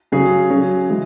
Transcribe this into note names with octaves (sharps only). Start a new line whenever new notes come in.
C#3 F#3 C#4 G#4
F#3 C#4 G#4
E3 G#3